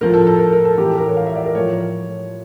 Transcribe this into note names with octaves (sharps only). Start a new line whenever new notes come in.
A2 F3 A#4
A4
A4
A#4
A#4
A4
A2 E3 G4
A4
A#4
C#5
F5
E5
D5
A#4
A2 F3 C#5